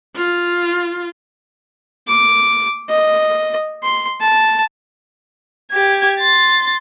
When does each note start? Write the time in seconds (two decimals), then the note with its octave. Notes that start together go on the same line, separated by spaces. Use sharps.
0.16 F4
2.08 D6
2.90 D#5
3.83 C6
4.21 A5
5.72 G4 G#6
6.20 C6 A6